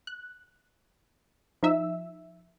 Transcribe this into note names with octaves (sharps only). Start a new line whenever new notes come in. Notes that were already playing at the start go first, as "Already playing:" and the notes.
F#6
F3 D#4 E5 E6